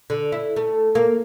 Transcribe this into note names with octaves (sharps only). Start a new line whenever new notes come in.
D3
E4
A3
A#3